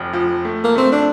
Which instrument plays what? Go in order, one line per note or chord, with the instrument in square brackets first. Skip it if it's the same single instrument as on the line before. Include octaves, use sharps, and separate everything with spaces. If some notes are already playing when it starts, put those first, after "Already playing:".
Already playing: [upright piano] F1 F2 F3
F3
A3
[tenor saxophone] A#3
[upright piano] A3 [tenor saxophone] C4
[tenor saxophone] D4